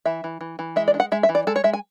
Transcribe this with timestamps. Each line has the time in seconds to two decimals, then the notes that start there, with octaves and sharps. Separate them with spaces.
0.05 E3 E5
0.24 E3
0.41 E3
0.59 E3
0.76 G#3 E5
0.88 D5
0.94 D4
1.00 F#5
1.12 G#3 E5
1.23 E5
1.29 E3
1.35 D5
1.47 G#3 A4
1.56 C#5
1.64 G#3 E5
1.73 G#5